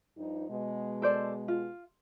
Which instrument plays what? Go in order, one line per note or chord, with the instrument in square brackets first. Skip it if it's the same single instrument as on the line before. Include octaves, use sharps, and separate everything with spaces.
[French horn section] G2 F3 D#4
B2 G#3
[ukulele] A4 C5 D5
F4